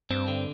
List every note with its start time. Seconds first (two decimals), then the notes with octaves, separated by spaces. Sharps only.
0.10 G2 C4
0.28 D3